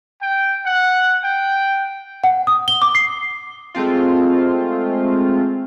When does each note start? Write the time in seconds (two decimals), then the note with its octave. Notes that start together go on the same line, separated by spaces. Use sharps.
0.21 G5
0.66 F#5
1.24 G5
2.24 F#5
2.47 D#6
2.68 G7
2.82 D6
2.95 C7
3.74 G#3 A3 C4 F4